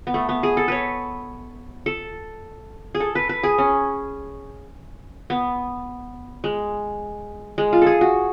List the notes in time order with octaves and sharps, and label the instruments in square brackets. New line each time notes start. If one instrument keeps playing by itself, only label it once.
[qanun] B3
A3
B3
G#4
A4
B4 C#5
A4
G#4
A4
B4
B4
G#4
C#4
B3
G#3
G#3
F4
G#4 A4
F#4